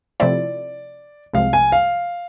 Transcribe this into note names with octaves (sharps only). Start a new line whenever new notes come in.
C3 F3 A3 C4 E4 D5
C2 C3 F3 G#3 F5
G#5
F5